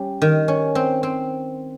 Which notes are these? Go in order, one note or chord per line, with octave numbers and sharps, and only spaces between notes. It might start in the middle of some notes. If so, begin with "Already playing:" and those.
Already playing: G3 C#4
D#3
C#4
C4
C4